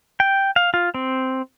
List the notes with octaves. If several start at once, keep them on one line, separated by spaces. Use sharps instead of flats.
G5
F5
F4
C4